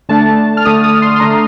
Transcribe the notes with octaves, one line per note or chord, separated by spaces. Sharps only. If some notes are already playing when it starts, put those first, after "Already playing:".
D3 A3 D4 A5
F6
D3 A3 D4 D#6
D#6
C6
C6
D3 A3 D4 A#5